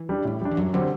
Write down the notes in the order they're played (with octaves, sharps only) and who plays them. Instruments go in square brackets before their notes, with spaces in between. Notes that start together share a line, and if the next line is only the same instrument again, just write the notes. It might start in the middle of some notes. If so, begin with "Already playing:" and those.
Already playing: [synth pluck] E3
[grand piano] G3 D4
A2
G3 D4
[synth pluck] E3
[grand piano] F#2 [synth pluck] F#3
[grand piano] D3 G3 C4 [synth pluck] F#3